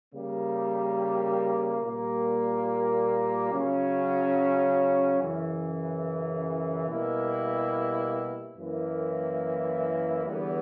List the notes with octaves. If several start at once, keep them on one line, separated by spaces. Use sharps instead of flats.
C#3 G3 A#3
A#2 G3 A#3
C#3 F#3 C#4
F#2 C#3 E3
B2 G3 A#3 E4
F#2 E3 A#3 E4
E2 D3 G3 B3